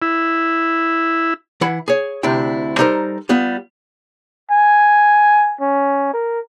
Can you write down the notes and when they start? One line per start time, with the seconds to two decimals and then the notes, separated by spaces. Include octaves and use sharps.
0.02 E4
1.61 E3 E4 F#5 B5
1.88 G#4 C#5
2.23 D2 C3 D4 E4 G5
2.78 G3 D#4 A4 A#4 C5
3.29 G3 B3 F4
4.51 G#5
5.61 C#4
6.13 A#4